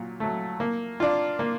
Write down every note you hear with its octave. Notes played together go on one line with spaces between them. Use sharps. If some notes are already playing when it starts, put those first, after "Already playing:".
Already playing: A#2 F#3
F#3 A3
A#3
D4 F4
A#3